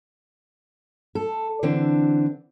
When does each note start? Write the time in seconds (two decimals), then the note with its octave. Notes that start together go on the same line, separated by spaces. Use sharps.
1.15 A4
1.63 D3 E3 C4 D4